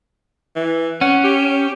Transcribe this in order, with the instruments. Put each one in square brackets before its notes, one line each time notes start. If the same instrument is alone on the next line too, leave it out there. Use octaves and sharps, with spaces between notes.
[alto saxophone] E3
[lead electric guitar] C#4 [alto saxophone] F#5
[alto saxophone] G4